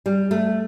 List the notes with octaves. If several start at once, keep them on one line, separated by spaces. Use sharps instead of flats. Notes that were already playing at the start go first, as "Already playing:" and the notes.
G3
A3